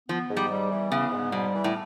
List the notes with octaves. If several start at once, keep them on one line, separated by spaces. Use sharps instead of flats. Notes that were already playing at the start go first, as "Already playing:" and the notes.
F3 B3
G#2
G3
G3
E3
C#3 B3
G#2
B2 G3
E3
A2